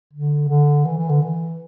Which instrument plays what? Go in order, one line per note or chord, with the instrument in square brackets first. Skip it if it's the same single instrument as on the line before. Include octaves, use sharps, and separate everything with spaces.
[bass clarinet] D3
D3
E3
E3
D3
E3